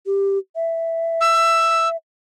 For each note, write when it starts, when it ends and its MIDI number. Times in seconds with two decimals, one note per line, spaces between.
0.06 0.38 67
0.56 1.96 76
1.21 1.88 88